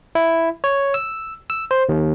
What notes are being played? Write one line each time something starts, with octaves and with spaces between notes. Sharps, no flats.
E4
C#5
E6
E6
C5
D#2